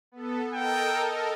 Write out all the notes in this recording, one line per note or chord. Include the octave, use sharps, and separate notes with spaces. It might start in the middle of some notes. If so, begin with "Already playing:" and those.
B3 A4
A4 A#4 D#5 G5